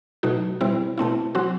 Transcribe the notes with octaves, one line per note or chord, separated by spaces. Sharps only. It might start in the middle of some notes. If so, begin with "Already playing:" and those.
B2 F#3 A3 D#4 F#4
B2 G3 C4 E4
B2 A3 C4 E4
F#3 C4 F#4